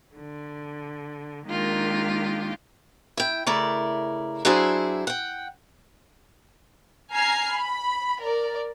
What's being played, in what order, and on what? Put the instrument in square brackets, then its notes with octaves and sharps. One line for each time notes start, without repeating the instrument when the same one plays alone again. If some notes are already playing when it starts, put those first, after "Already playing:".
[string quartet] D3
D#3 G#3 A#3 D4 F4 G4
[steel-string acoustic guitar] E4 G5
C#3 A3 E4 A#4 D5
F#3 D4 E4 G#4 C5
F#5 G5
[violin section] G#5 A#5 F6 G#6 C7
B5
A#4 D5